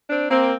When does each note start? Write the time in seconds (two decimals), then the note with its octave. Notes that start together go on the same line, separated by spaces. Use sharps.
0.09 C4 D4
0.31 A#3 C4